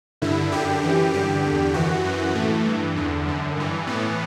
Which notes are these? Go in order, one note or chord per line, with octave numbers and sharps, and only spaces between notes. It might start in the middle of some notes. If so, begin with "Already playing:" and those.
G2 D3 E4
F#2 D3 G4
F#2 E3
G2 D3 G4
E2 D3
F#2 E3 F#4
F#2 E3
A2 E3 A3
G2 E3
E2 D3
F#2 D3
G2 E3
A2 E3 B3